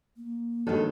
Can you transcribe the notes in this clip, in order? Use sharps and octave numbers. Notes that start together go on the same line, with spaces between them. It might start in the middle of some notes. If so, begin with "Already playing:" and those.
A#3
G2 D#3 F#3 G#3 A4